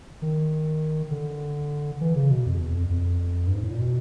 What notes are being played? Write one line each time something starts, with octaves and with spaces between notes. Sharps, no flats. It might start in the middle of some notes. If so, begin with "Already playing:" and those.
D#3
D3
E3
C#3
B2
F2
E2
F2
F2
G2
G#2
A2
A#2
B2